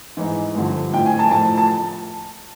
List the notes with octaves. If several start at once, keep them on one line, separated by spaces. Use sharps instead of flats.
G#2 E3
G2 D3 F3
A2 F3 G5
G#5
A5
A2 F3 A5
A5